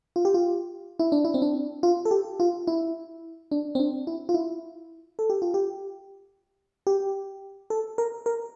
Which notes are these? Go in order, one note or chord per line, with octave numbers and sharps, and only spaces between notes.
F4
G4
F4
E4
D4
E4
C4
D4
F4
A4
G4
F4
E4
D4
C4
D4
E4
F4
E4
A4
G4
F4
G4
G4
A4
A#4
A#4